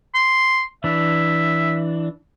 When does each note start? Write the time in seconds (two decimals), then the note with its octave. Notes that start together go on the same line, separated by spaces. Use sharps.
0.15 C6
0.84 E3 D4 E5